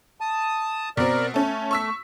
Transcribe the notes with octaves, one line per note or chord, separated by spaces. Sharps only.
A5 D#6
B2 C4 A#4 D5
A3 C#4 A4
C#6 E6 B6